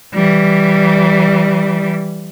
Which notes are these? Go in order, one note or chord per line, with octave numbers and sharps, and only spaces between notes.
E3 G3